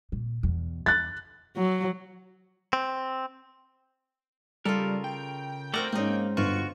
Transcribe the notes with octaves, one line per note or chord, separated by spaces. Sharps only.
A#2
E2 B2
E2 F#6 A6
F#3
C4
C#3 G3 F4 A4 A#4
G5
A3 C4 F#4 A#4 D5 A#5
G#2 A#3 C4 C#4 D#4
G1 F4 F#4 C#6